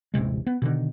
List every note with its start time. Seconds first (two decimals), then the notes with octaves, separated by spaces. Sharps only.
0.14 D#1 A1 C3 G#3
0.47 B3
0.62 B2 D3 D#3